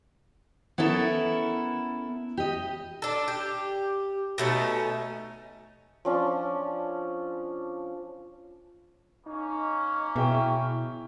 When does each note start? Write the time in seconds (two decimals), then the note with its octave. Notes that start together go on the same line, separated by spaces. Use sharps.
0.78 B3 C#4 E4 A4 A#4
2.37 G4 D#5
3.02 D4 A4
3.28 G4
4.38 B2 A3 C#4 D#4
6.05 F3 C#4 D4
9.26 A#3 C#4 D#4
10.16 B2 E4 G#4 E5 G5